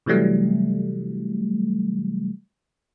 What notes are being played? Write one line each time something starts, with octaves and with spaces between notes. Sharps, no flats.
C3 E3 F#3 G3 A3